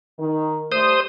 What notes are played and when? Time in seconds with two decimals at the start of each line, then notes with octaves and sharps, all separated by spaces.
0.19 D#3
0.72 G3 A3 C5 D#6